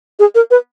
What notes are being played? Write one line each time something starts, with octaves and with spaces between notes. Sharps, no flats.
G#4
A#4
B4